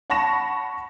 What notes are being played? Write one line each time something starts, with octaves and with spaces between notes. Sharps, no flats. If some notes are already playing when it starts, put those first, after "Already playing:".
F#5 A5 B5 C#6 A#6 E7